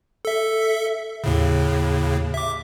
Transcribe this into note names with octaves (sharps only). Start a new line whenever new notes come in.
A4 E5
D#2 A2 C#3
E5 D6